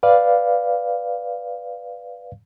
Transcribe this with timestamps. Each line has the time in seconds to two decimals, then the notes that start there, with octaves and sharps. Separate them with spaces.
0.03 B4 D5 F5